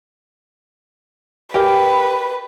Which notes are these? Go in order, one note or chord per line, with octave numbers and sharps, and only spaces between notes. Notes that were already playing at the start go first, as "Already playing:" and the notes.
G4 A#4 B4 G5